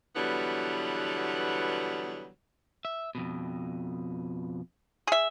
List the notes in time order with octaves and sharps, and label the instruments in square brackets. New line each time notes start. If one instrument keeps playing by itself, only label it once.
[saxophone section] B2 D3 E3 F#3 G3 B3
[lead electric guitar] E5
F2 B2
[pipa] G#4 E5